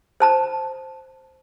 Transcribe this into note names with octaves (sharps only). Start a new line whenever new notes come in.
C5 A5 A#5